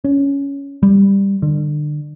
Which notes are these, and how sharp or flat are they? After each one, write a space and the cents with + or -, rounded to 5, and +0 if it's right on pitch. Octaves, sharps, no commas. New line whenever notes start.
C#4 +10
G3 +10
D3 +30